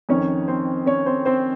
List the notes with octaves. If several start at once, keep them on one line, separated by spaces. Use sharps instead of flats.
F2 D#3 C#4 C#5
C4 C5
C#4 C#5
C4 C5
C4 C5